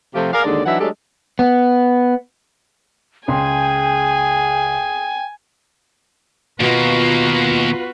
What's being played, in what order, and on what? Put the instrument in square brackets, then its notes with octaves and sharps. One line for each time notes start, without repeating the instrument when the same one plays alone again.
[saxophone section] C3 F3 A3 F4 G4
G#4 A#4 D5 F5
D#2 D3 G#3 D4 D#4 D5
E3 F#3 D4 D#4 E5 F#5
F#3 G#3 A3 D4 G4 A4
[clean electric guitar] B3
[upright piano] C#2 C6 [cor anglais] G#4 [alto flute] G5 [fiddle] G#5
[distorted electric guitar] D#2 A#3 [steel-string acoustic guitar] B2 [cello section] F4 F#4 B4